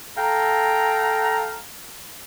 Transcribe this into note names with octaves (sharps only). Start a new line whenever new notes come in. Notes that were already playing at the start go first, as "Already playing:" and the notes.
A4 F5 G5 A#5